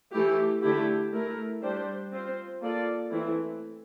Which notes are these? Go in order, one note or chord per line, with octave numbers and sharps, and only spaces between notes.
E3 A3 E4 G4
D3 A3 E4 G4
A3 E4 A#4
G3 D4 G4 C5
C4 F4 C5
A#3 F4 A4 D5
E3 A3 C4 E4